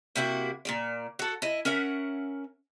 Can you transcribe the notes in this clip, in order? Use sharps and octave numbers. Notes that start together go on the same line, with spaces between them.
C3 A#3 E4 F#4
A#2 F3 D5
F#4 A4
E4 D#5
C#4 A#4 E5 F#5